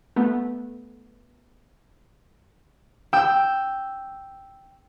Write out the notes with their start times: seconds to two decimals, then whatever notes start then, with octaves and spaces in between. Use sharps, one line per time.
0.16 A3 B3
3.13 G5 E6